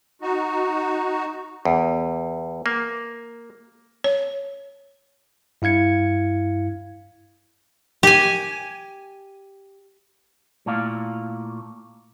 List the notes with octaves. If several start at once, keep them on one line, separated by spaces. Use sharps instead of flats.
D#4 F#4
E2
A#3
C#5
G2 E4 F5 G#6 C#7
G4 G#5
A#2 A3 E4 D5 F5